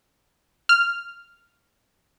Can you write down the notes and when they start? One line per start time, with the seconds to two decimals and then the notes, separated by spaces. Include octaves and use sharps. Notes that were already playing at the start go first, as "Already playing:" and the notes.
0.69 F6